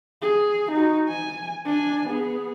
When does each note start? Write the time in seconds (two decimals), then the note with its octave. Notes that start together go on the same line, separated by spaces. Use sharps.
0.22 G#4
0.72 D#4 F#4
1.08 G#5
1.66 D4 G#5
2.08 B3 G#4